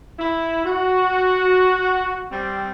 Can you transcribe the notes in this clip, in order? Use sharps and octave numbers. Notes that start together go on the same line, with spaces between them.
E4
F#4
G3 C4